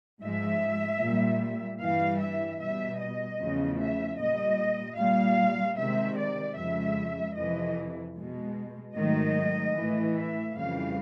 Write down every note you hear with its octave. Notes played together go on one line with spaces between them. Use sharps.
G#2 F3 G#3 E5
A#2 G3
G2 E3 G3 F5
E5
B2 G3 E5
D#5
E2 C#3 F3 A3
E5
A#2 G3 D#5
A#2 G3 F5
C3 D#3 G#3 E5
D5
F2 C#3 F3 G#3 E5
F2 C3 E3 D#5
B2 G#3
G#2 D#3 F#3 A3 D#5
A2 E3 A3
E5
F2 C#3 E3 G3 F5